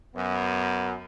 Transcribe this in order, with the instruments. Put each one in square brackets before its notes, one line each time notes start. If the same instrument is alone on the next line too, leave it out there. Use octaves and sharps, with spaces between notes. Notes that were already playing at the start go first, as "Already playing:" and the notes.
[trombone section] F#2 B3